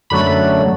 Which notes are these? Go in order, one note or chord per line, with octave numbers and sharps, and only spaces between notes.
F#2 D3 F#3 A3 B5